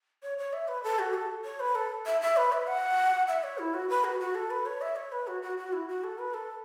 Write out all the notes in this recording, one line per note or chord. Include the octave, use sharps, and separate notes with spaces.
C#5
C#5
E5
B4
A4
F#4
A4
C#5
B4
A4
E5
E5
B4
E5
F#5
E5
C#5
E4
F#4
B4
F#4
F#4
A4
B4
C#5
E5
C#5
B4
F#4
F#4
F#4
E4
F#4
A4
B4
A4